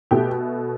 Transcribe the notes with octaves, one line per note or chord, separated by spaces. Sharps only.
B2 A3 G4